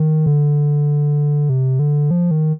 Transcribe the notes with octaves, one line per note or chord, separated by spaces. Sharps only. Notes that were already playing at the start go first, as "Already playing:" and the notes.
Already playing: D#3
D3
C3
D3
F3
D#3